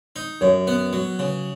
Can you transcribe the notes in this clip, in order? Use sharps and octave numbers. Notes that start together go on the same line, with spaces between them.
D#4
F#2 C#5
B3
F#3
C#3